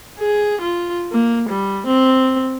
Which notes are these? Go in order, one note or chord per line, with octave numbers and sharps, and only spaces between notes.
G#4
F4
A#3
G3
C4